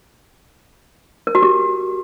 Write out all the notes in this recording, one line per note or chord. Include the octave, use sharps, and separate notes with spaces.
A#4
F#4
G4